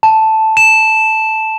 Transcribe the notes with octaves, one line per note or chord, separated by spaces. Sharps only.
A5
E7